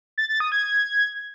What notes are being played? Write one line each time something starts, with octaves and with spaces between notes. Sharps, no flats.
A6
A6
D#6
G#6